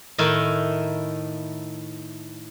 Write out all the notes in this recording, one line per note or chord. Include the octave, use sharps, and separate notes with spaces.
A2 D#3 D#4 E4